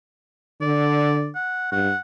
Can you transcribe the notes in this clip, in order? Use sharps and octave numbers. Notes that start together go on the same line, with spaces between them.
D3 D5
F#5
G2 F#5